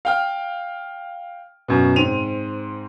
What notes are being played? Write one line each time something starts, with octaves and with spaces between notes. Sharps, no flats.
F5 G5 F6
F#2 B2
G#2 C4 D#7 F7